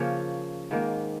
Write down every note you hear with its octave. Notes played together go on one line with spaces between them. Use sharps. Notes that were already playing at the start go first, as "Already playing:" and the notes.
Already playing: C#3 F3 A#3 C#4 C#5
G#2 D#3 A#3